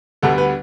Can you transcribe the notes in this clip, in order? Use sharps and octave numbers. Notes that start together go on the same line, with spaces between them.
D2 D3 G3 B3 A4
B4